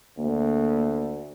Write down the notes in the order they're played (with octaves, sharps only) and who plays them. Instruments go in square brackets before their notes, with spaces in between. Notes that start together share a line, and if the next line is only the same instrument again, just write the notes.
[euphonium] D2 [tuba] A#3